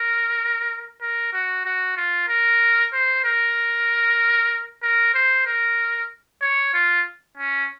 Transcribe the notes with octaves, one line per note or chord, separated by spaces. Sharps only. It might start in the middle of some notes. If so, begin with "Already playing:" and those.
Already playing: A#4
A#4
F#4
F#4
F4
A#4
C5
A#4
A#4
C5
A#4
C#5
F4
C#4